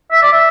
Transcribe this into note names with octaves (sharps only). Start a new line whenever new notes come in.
E5
D5
E5